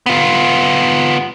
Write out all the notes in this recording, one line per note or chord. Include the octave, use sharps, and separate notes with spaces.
B3 F4